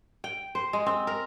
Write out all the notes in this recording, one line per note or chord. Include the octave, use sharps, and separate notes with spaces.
G5
C5
G#3
C4
A#4